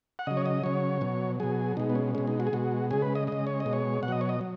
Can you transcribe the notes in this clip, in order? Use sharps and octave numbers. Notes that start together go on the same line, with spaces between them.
F#5
C#3 F#3 D#5
C#5
D#5
C#3 F#3 C#5
B2 F#3
B2 F#3 G#4
B2 G#3 D#4
B3
C#4
B2 G#3 C#4
D#4
F#4
G#4
B2 G#3 F#4
C#3 G#3 G#4
B4
D#5
C#3 G#3 D#5
C#5
D#5
B2 G#3
C#5
B2 F#5
F#3 D#5
C#5
D#5
F#3